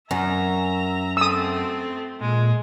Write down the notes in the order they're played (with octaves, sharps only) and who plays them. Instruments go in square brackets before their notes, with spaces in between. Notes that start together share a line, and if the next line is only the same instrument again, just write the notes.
[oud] F#2 [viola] E5 A#5
[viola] A3 C4 [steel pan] D#6 E6
[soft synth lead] A#2 [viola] G#3